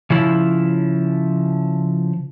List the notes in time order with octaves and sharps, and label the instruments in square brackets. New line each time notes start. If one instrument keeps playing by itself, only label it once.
[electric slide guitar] C#3 F3 E4